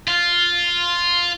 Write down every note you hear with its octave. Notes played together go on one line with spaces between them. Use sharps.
F4